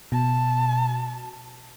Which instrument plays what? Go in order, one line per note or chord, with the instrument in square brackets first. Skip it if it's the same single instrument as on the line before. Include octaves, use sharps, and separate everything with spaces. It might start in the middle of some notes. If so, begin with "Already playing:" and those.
[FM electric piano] B2 [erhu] A5